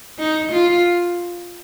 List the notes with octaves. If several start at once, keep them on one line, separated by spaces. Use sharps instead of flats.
D#4
F4